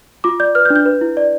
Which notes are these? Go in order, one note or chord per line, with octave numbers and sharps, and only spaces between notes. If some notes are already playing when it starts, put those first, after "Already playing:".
F4 D6
D5 G6
B4 F6
G6
D4
G6
B4
E4
D5